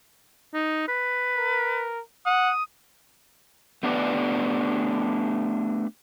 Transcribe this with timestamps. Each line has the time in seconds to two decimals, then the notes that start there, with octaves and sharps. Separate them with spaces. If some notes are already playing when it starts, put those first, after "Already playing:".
0.54 D#4
0.88 B4
1.37 A#4
2.26 F#5 D#6
3.83 A3 B3 D4 G4 B4 D5